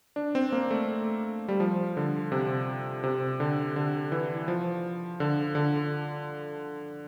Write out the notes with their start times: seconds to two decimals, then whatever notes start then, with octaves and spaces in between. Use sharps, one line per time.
0.16 D4
0.35 C4
0.52 A#3
0.71 A3
1.48 G3
1.60 F3
1.97 D3
2.32 C3
3.04 C3
3.40 D3
3.76 D3
4.12 E3
4.48 F3
5.20 D3
5.55 D3